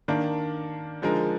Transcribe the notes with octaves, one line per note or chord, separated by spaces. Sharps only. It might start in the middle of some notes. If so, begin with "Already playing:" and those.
D#3 A#3 D4
D3 F3 G#3 D#4 A#4